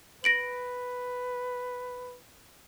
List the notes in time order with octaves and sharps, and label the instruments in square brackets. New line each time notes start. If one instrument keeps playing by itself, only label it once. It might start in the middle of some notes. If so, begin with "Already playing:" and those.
[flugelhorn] B4 [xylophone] A#6 D7 F#7